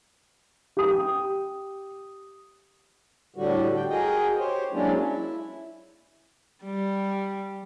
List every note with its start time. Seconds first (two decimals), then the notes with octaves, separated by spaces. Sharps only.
0.77 G4 D#6
3.36 A2 D3 G3 F#4
3.75 G5
3.90 F#4 G#4 A#4 D#5 G5
4.39 G4 C5 C#5
4.72 F#3 G#3 A#3 C#4 D4 E4
5.05 E4
6.64 G3